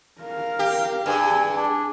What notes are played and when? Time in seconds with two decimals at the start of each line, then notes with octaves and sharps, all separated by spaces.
0.21 A#4 F5
0.59 G4
1.06 G2 G#4 G#5
1.56 D4